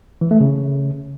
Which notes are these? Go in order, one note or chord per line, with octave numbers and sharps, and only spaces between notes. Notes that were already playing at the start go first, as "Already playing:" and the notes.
E3
A3
C#3